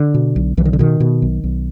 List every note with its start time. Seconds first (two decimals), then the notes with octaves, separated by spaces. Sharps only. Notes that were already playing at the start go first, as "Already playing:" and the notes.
Already playing: D3
0.14 B2
0.36 B1
0.57 B1 E3
0.65 D#3
0.73 D3
0.79 B2 D#3
1.00 B2
1.22 B1
1.44 B1